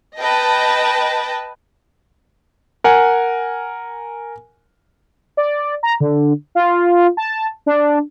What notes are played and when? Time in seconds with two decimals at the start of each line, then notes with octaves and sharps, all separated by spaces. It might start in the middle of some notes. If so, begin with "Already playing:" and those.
0.17 B4 D#5 G5 A5
2.84 A#4 F#5 G#5
5.37 D5
5.83 A#5
6.00 D3
6.55 F4
7.17 A5
7.66 D4